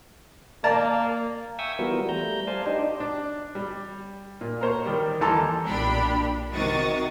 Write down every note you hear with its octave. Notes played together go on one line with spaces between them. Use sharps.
A#3 D5 A5 A#5
E5 G5 G#5 C#6 D#6 E6
E3 G3 B3 F4 F#4 A#4
G3 A3 A#5 G6
C5 D5 F5 G#5 A5
D4 D#4 G4 C5 D5 D#5
D4
G3
A#2
A#4 C5 C#5
D#3 G3
D#2 E3 A4 A5 A#5 C6
B1 A#2 D4 G4 B5
C3 D#3 F#4 C#6 D#6 A6